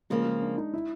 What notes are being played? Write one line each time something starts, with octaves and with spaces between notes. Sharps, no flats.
C#3 F3 G#3 A#3
G#3
D4
D#4
E4